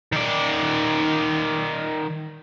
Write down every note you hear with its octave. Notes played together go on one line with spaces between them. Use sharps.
D#3 D5